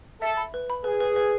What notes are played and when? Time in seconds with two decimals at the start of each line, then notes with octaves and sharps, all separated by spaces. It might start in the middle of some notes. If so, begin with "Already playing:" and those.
0.21 A4 E5
0.37 B5
0.54 B4
0.70 B5
0.84 G#4 B4
1.00 B4
1.16 B4